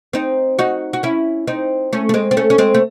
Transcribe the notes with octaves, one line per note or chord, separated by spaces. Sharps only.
C4 D#4
D#4 F#4
F#4
C#4 E4
C4 D#4
A3 C#4
A3
G#3 C4
C4
A3 C#4
C#4
G#3 C4
A3